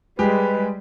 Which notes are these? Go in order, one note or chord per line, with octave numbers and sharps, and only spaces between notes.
G3 G#3 G4 G#4 B4